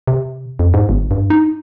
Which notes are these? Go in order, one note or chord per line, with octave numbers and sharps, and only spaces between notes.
C3
F2
G#2
G1
G2
D#4